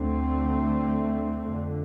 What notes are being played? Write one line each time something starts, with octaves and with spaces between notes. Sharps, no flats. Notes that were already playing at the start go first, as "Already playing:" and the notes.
Already playing: D2 D3 A3 C4
F2 D3